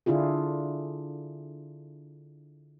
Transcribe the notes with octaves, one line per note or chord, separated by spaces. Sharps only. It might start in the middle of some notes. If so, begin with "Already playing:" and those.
D3 D4 E4 F4 G#4